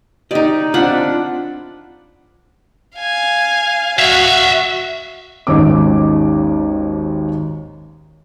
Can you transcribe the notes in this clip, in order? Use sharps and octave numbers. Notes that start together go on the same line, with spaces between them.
D#4 G4 D5 D#5
C4 D4 F4 F#5 B5
F5 G#5
F#4 E5 F5
G#1 D#2 C#4 D#4 C#5 D6